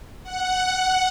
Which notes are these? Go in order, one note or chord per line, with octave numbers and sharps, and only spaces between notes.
F#5